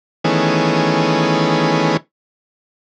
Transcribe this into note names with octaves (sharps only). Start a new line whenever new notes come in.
D#3 E3 A3 B3 C#4 G#4